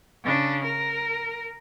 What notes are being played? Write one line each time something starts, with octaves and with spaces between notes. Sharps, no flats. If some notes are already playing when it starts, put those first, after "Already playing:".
C#3 D4
A#4